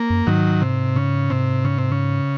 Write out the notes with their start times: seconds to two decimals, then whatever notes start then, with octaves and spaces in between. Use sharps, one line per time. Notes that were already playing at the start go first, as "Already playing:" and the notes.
Already playing: A#3
0.10 F#2
0.27 G#2 D#3 F#3
0.62 C3
0.96 C#3
1.30 C3
1.65 C#3
1.78 C3
1.91 C#3